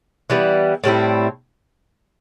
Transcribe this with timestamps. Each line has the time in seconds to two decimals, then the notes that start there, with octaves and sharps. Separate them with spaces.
0.30 E3 G3 B3
0.84 A2 G3 C4 E4